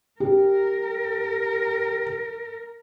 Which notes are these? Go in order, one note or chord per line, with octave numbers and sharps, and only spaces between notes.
G4 A#4